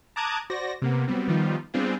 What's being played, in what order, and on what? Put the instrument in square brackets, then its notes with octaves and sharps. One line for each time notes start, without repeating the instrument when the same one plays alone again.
[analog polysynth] A5 A#5 D6 D#6 F#6 G#6
F#4 C5 D5 A#6
C3 A#3 B3
F#3 G3 B3 C4
D#3 F3 G3 B3 D#4 F4
G3 B3 C4 D4 F4 G#4